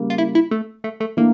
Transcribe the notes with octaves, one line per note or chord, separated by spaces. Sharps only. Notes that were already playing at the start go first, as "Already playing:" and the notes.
Already playing: C#3 G3 A#3
F4
E4
E4
A3
A3
A3
E3 A3 A#3 D4